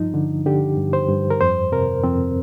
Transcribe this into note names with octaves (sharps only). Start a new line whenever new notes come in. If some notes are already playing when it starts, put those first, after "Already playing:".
Already playing: G2 F3 D#4
D3
D3 G4
G2
C5
G2
A#4
F2 C5
C3 A#4
F2 C4